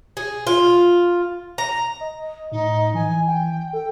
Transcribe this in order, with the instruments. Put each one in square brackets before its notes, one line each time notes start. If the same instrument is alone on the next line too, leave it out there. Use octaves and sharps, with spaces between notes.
[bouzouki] G#4
F4
A#5
[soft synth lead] D#5
[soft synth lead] A2 [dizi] D#4
[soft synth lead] E3 [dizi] G#5
[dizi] G5
[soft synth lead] A4 [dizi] G5